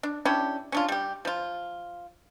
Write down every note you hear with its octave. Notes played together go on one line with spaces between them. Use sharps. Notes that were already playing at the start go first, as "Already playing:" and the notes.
D4
C#4 D4 E4 G4
C#4 D4 F4
G3 G4
F3 F4